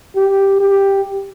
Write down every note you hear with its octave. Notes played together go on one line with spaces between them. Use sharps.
G4
G4